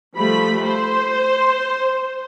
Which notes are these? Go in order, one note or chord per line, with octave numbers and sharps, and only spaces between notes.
F3 G3 A3 B5
C5